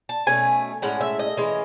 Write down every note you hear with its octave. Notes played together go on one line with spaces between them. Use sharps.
A5
B2 A3 C#4 G#5
A2 G#3 C#4 F#5
E5
D#5
E3 G#3 C#4